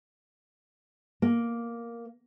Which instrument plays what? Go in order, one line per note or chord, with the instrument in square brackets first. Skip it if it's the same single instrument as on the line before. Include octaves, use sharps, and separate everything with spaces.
[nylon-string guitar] A#3